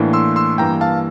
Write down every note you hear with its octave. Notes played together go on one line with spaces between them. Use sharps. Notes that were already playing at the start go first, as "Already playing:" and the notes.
Already playing: A2 E3 A#3 D4
C6 E6
C6 E6
G2 E3 A#3 G5 A#5
F5 A5